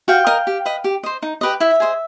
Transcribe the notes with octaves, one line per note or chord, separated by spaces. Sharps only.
F#4 F5 G5
A#4 D#5
G4
B4 D#5
G4
C5 D#5
D#4
G4 B4 D#5
E4 E5
G#4 C5 D#5